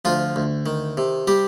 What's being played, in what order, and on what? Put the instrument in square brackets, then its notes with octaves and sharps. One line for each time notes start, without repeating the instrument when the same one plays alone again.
[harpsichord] D2 F3 F4
D2
D#3
C3
G3 G4